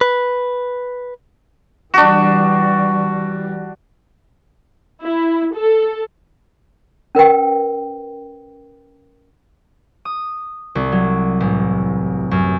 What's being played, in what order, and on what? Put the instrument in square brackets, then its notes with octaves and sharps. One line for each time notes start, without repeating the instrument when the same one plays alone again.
[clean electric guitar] B4
[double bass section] E3 G3 [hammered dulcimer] D4 F#4
[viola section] E4
A4
[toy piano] C#4 A#4 B4 G5
[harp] D#6
C2
F#3
A1
F#2